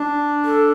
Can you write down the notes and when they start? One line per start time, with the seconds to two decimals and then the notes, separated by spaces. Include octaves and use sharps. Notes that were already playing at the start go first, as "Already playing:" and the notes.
Already playing: D4
0.45 A4